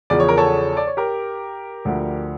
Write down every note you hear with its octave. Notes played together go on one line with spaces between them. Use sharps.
E2 C#3 F3 D5
C#5
A#4
A4 C#5
D5
C#5
G4 A#4
D2 D3 F3